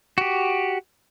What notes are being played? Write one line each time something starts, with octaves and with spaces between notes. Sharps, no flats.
F#4 G4